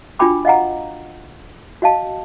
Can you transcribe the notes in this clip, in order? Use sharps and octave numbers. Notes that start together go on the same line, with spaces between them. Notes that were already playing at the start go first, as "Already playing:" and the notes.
D4 F4 F#4 G5 B5 D6
D#5 F5 F#5 A#5
F#4 D#5 F5 A5